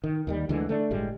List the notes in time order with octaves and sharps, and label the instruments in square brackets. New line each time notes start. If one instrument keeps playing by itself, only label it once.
[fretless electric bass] D#3
D#2 D#3 G3
D2 D3 E3 G#3
A3 C4 D4
G1 A2 G3 G#3